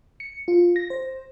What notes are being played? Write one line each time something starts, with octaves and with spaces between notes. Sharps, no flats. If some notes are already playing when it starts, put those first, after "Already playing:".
C#7
F4
A#6
C5